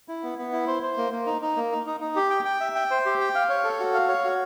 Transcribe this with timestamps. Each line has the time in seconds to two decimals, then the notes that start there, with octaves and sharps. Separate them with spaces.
0.08 E4
0.23 B3
0.38 B3
0.52 E4
0.67 C5
0.83 C5
0.97 A#3
1.12 A#3
1.26 D#4
1.42 D#4
1.56 A#3
1.72 D#4
1.87 D#4
2.00 D#4
2.16 G4
2.30 G5
2.45 G5
2.61 E5
2.75 G5
2.91 C5
3.05 G4
3.20 G5
3.35 F5
3.49 C#5
3.64 A4
3.80 F#4
3.94 F5
4.08 C#5
4.24 F#4